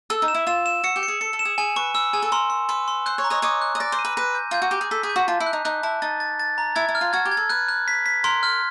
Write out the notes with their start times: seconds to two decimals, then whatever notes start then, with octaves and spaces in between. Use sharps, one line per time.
0.10 A4 E6
0.22 D#4
0.28 E7
0.35 E4
0.47 F4 E7
0.66 E7
0.84 F#4 C#7
0.96 G4
1.03 C#7
1.08 G#4
1.21 A4 C#7
1.33 A4
1.39 E7
1.45 G#4
1.58 G#4 G#5
1.76 B4 C#6
1.94 B4 E6
2.13 G#4 G#5
2.22 A4
2.32 A#4 C6
2.50 C6
2.69 B4 C6
2.88 C6
3.06 C5 F#6
3.18 C#5
3.24 A#5
3.30 C#5 D#5
3.42 C#5 D#5 D6
3.62 F#6
3.75 D#5
3.80 D5 A#6
3.92 C5
3.99 D#7
4.05 B4
4.17 B4 A#6
4.35 G6
4.51 F4 G6
4.62 F#4
4.71 G4 D6
4.81 G#4
4.91 A4 B6
5.03 G#4
5.09 G6
5.16 F#4
5.28 F4 A5
5.40 E4
5.46 F#6
5.53 D#4
5.65 D#4 F#6
5.83 E4 A5
6.02 D#4 A6
6.20 A6
6.40 A6
6.58 A#5
6.76 E4 G#6
6.89 E4
6.95 F6
7.01 F4
7.13 F#4 G#6
7.25 G4
7.31 G#6
7.37 A4
7.49 B4 F#6
7.68 F#6
7.88 B6
8.06 B6
8.24 A#4 C6
8.43 F6